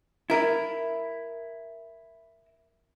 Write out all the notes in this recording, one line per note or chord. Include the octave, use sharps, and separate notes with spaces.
E4 A#4